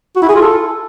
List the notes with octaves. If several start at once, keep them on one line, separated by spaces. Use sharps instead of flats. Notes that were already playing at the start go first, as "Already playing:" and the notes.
F#4
E4
G#4
F4
A4